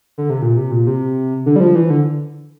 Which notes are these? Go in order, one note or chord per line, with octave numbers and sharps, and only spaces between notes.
D3
C3
A#2
C3
A#2
C3
D3
G3
F3
E3
D3